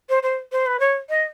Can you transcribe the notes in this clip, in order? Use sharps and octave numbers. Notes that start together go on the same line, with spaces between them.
C5
C5
C5
B4
C#5
D#5